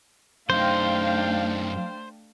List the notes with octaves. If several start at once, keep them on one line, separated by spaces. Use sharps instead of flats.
F#2 A3 D4 D#4 C5 F5 G5